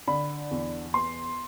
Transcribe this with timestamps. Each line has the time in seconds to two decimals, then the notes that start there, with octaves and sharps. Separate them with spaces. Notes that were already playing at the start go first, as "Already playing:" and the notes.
0.08 D3 B5
0.51 E2
0.94 B3 C6